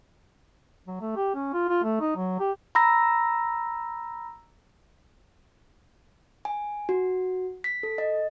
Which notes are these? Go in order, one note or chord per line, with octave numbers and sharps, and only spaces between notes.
F#3
A3
G4
C#4
F4
F4
A3
D#4
F#3
G4
A#5 B5 E6 A#6
G#5
F#4
B6
A4
D#5